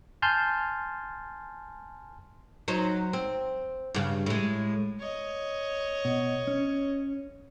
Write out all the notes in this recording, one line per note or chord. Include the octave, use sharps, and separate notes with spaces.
G#5 A5 C6 F6 G6
F#3 D#4 C5
C4
G2 C#3
A2 G#3
C#5 D#5
B2
C#4